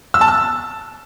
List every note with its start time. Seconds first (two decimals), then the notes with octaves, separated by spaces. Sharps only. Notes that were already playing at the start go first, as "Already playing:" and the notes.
0.14 E6
0.21 A5
0.28 E6